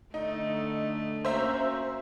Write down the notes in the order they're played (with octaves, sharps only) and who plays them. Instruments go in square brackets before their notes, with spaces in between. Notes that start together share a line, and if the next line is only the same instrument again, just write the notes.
[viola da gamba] D3 A3 [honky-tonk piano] D#4
[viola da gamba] A#3 C#4 F#4 [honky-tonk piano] C5 E5 A#5